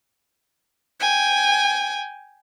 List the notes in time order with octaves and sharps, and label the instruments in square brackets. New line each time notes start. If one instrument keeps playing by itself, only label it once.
[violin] G5 G#5